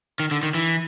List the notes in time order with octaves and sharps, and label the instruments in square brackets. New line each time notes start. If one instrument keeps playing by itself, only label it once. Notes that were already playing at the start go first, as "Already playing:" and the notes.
[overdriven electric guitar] D#3
D3
D#3
E3